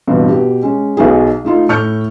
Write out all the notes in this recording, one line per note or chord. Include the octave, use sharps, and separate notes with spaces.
A1 G2 B2 C4
B2 G4
G#3 C#4
B1 B2 D#4 G#4
A3 D#4 F4
A2 C#6 F6 G6 C#7